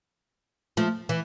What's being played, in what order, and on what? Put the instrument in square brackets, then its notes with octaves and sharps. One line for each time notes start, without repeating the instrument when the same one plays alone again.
[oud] F3 A3
E3